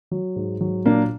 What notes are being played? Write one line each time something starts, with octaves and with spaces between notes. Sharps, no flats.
F#3
G#2
F#3
A#2 A#3 D4